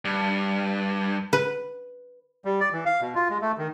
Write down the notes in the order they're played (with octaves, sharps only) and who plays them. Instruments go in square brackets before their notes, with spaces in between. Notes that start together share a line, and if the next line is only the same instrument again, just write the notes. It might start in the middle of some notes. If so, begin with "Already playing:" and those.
[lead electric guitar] G2
[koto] B4
[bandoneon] G3
D5
E3
F5
B2
F4
G#3
A3
D#3